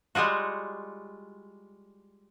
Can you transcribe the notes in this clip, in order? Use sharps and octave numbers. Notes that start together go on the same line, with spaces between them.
G3 G#3 F4 F#4